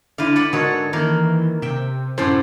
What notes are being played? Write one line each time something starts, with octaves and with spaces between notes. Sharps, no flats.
D3 E4 B4 F5
B4 D5 F#5
G#2 D3 F#4 A4 A#4 C#5
D#3 E3 A#3 A#4
C3 E5 G5
F#2 A2 C3 E4 C5